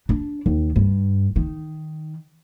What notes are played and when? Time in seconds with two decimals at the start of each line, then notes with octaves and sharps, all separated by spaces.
0.09 D4
0.46 D#2
0.76 G2
1.36 D#3